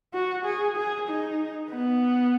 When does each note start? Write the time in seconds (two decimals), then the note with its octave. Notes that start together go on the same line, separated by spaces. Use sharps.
0.14 F#4
0.45 G#4
0.77 G#4
1.08 D#4
1.70 B3